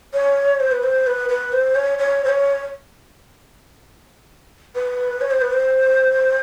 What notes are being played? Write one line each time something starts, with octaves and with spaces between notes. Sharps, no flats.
C#5
C5
B4
C5
B4
B4
C5
C#5
C#5
C5
C#5
B4
C#5
C5
B4
C5